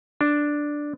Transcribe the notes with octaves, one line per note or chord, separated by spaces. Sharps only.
D4